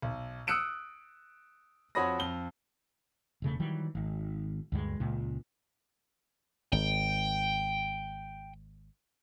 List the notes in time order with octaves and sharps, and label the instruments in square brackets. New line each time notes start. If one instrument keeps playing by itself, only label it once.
[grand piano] B1
D#6 E6 F#6 C#7 D7 E7
F2 F#4 C#5 B5 D#6 A#6
F2 G7
[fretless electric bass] E1 C#3 A3
D#3 E3 F#3 G3
G#1
D2 G2 F#3 G#3
C#2 A#2
[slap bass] G#1 [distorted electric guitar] G5